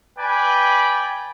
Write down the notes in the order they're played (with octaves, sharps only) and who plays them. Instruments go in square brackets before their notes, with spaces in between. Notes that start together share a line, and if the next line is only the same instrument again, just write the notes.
[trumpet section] B4 D5 G5 G#5 B5